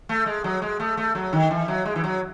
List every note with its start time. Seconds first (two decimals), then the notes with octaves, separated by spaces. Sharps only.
0.09 A3
0.26 G#3
0.44 F#3
0.62 G#3
0.80 A3
0.97 A3
1.15 F#3
1.33 D#3
1.51 E3
1.68 F#3
1.85 G#3
1.96 E3
2.04 F#3